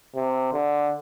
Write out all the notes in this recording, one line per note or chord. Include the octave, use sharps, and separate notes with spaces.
C3
D3